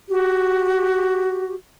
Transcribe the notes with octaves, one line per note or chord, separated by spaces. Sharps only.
F#4 G4